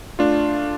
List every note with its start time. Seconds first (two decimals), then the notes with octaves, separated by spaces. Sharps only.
0.19 A3 D4 F4